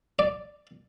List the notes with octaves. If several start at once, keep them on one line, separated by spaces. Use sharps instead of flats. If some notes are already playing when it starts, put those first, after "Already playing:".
D5